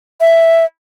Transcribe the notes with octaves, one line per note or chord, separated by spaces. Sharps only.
E5